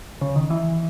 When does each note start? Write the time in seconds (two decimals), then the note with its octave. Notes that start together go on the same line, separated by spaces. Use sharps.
0.21 C#3
0.36 D#3
0.50 E3